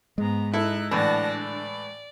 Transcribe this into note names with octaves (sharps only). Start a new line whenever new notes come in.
G#2 G#3 B3 A#5
D#4 E4 A4 F#6
A2 D3 E3 D4 F#5 A5 A#6
D5